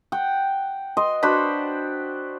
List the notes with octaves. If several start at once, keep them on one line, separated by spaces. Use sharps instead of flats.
F#5 G5
D#5 C6
D4 F#4 C5 B5